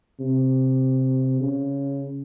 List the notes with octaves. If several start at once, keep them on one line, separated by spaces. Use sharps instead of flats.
C3
C#3